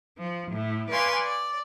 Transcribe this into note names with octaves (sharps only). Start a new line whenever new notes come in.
F3
A2 A3
B4 D5 F5 G#5 C6 C#6
D5